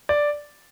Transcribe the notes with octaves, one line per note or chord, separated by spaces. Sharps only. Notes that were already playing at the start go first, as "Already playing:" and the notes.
D5